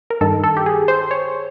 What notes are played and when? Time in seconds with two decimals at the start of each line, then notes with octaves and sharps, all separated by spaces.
0.10 A#4
0.21 G2 D#3 A4
0.44 A4
0.57 G4
0.66 G#4
0.88 C5
1.11 C#5